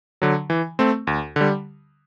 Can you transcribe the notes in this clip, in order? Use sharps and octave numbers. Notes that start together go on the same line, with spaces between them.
D3 F#3
E3
A3 C4
D2
D3 G3